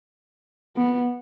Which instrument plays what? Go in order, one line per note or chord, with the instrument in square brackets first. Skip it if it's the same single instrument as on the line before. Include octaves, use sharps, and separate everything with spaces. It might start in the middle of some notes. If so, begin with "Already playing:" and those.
[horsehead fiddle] B3